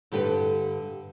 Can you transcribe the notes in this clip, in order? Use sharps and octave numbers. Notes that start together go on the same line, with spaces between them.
G2 D3 G4 A4 B4